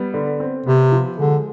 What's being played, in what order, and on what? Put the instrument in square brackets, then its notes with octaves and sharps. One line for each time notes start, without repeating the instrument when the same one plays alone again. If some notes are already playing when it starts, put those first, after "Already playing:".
Already playing: [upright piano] G3 B3
D3
C4
[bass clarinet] C3 [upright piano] B3
[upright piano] F3
[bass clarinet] D3 [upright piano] G#3